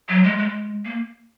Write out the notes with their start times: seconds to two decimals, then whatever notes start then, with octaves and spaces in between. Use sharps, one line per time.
0.09 F#3
0.24 G#3
0.39 G#3
0.85 A#3